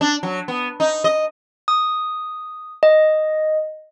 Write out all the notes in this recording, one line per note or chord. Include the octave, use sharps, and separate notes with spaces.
D4
F#3
B3
D#4
D#5
D#6
D#5